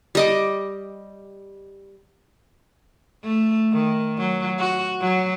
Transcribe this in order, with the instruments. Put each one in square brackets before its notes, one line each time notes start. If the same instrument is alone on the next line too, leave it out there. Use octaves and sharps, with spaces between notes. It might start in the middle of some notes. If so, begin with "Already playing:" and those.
[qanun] G3 D#5 D6
[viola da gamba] A3
D#3
F#3
F#4
F#3